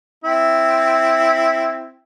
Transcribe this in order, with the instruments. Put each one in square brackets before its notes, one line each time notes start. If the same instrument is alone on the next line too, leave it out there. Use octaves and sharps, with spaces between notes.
[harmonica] C4 E4